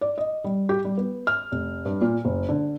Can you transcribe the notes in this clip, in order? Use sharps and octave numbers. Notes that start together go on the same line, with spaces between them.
D5
D#5
G3
G4
G3
B3
F6
F1
G2
A#2
F#1
D3